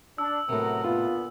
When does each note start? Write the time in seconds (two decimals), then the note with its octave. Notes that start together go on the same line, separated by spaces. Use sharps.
0.18 D4 E6
0.49 A2 C3 F#3 B3 A#4
0.84 A#2 D3 B3 F4